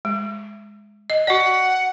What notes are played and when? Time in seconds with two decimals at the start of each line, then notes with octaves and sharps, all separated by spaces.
0.05 G#3
1.10 D#5
1.27 F#4 D5 F#5